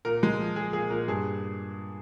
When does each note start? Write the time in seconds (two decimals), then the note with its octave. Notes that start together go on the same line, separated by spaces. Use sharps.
0.05 A#2 A#4
0.23 G#3
0.39 F3
0.56 F3 G#4
0.73 A#2 G#4
0.90 A#2 A#4
1.08 G2 G#4